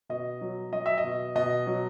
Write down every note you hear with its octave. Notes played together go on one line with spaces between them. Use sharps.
B2 D#5
F#3
F#3 D#5
E5
D#5
B2
B2 D#5
F#3